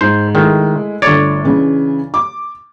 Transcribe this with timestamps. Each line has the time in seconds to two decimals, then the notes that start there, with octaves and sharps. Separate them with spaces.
0.01 G#2 C5
0.35 D#3 G#3 A3 E4
1.02 G1 A3 C#5 D5 A6
1.44 C#3 E3
2.14 D6